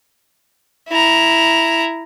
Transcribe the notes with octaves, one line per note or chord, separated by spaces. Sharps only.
E4 A#5